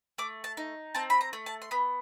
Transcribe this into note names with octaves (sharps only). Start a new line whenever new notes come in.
A3 D6
A5
D#4
C4 A5
B5
A#5
A3
A5
C6
B3 B5